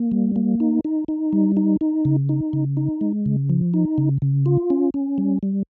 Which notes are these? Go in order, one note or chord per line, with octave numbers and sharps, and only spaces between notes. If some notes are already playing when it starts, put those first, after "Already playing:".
Already playing: A#3
G3
A#3
D#4
D#4
D#4
G3
D#4
D#4
C#3
D#4
C#3
D#4
G#3
C#3
F3
D#4
C#3
C#3
F4
C#4
C#4
G3
G3